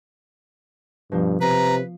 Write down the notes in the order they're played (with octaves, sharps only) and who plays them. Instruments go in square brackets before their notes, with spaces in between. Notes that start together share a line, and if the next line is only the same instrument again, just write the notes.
[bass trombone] G2 [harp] B2 F3
[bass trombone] C3 [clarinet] B4 [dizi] A#5 [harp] C7 D#7